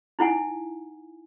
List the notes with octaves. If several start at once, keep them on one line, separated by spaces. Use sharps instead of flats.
D#4 E4 F#5 G#5